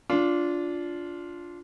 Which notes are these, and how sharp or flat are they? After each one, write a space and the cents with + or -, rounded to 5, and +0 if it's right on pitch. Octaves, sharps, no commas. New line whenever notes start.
D4 -15 F4 +0